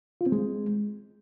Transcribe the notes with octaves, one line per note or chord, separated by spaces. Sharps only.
F4
C4
G#3